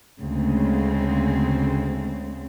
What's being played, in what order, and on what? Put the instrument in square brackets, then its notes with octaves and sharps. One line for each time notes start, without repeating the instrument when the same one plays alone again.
[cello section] D2 C#3 G#3 C4